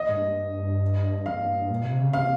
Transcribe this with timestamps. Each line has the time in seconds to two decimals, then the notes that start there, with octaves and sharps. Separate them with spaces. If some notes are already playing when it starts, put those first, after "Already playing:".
Already playing: D#5
0.09 G#2
0.16 G2
1.26 F2 F5
1.41 G2
1.56 G2
1.70 A#2
1.84 C3
2.00 C#3
2.13 C3 F5